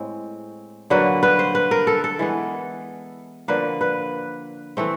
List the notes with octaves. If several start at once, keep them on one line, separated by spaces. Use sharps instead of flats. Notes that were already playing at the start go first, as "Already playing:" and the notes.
Already playing: A2 G#3 C4
D3 F#3 A#3 B4
B4
C5
B4
A#4
A4
A4
E3 G#3 B3
D3 F3 A#3 B4
B4
E3 A3 C4